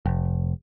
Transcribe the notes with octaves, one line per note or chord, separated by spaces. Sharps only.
F1